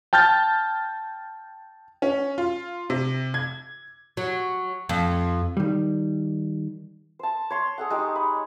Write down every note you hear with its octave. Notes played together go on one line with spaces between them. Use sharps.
G5 A5 F6 G6 A6
C#4
F4
C3
G#6
F#3
F2
D#3 G3
C5 A5
C#5 C6
G#4 A4 F#5
G#3 D#4 G4
B5